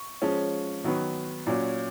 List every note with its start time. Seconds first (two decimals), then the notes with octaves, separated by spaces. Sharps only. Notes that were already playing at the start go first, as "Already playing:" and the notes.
Already playing: C#6
0.22 F3 G#3 C#4
0.84 D#3 F#3 B3
1.46 A#2 F#3 C#4